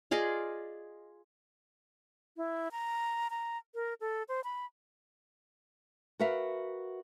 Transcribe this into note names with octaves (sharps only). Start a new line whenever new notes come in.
F4 G#4 D5 D#5
E4
A#5
A#5
A#4
A4
C5
B5
F#4 A#4 B4 E5 F5